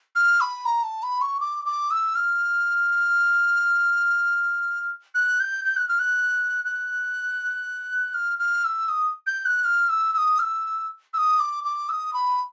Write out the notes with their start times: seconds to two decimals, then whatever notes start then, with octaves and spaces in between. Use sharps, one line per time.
0.15 F6
0.41 B5
0.65 A#5
0.84 A5
1.03 B5
1.21 C#6
1.40 D6
1.65 D6
1.91 E6
2.15 F6
5.15 F#6
5.40 G6
5.65 G6
5.76 F#6
5.88 F6
5.99 F#6
6.65 F#6
8.14 F6
8.39 F6
8.65 E6
8.89 D#6
9.26 G6
9.45 F#6
9.64 F6
9.89 E6
10.14 E6
10.17 D#6
10.39 F6
10.42 E6
11.14 E6
11.18 D#6
11.39 D6
11.64 D6
11.89 E6
11.92 D#6
12.13 B5